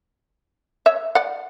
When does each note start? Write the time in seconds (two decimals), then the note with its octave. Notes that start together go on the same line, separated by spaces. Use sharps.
0.86 C#5 E5
1.15 D5 F#5